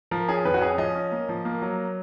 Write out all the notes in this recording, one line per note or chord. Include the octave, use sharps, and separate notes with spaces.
F3 A#4
C#4 G#4
F2 B4
F#4
C#4 G#4
F3 D#5
C#4
A#3
F3
A#3
F#3